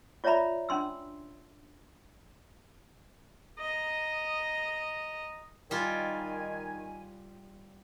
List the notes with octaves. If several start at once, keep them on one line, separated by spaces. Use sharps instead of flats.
F4 C#5 D5 E5 A#5 B5
C#4 D4 C6 E6
D#5 A#5
D#3 G3 F4 G#5